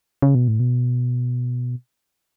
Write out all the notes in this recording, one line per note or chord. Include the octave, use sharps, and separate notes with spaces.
C#3
B2
A2
B2